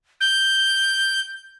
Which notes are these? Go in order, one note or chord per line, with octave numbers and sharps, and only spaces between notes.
G6